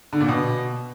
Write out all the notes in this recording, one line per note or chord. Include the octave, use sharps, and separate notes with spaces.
D3
A#2
B2